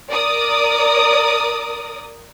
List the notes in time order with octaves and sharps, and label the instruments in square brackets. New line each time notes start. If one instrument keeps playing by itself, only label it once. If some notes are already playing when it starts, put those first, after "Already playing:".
[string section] A#4 D5 D#6